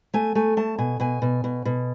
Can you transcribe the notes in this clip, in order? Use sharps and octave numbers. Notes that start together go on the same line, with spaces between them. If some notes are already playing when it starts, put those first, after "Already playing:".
A3 G#5
A3 G#5
A3 A5
B2 G#5
B2 G#5
B2
B2
B2